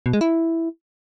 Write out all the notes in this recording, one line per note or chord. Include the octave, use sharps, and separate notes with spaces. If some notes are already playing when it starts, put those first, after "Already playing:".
B2
G#3
E4